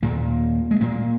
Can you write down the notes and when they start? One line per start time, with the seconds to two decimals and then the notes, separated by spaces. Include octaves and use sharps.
0.02 D#2 A#2 A#3
0.71 G#3
0.81 A#2 A#3